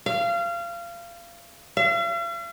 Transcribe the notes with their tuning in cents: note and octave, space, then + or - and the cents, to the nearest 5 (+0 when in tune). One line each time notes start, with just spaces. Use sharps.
F5 -25
F5 -45